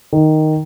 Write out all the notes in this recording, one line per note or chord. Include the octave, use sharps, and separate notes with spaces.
D#3